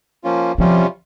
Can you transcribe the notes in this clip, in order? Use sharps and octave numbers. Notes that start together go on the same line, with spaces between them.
F3 A#3 C#4 F4
C3 F3 G3 C#4 F4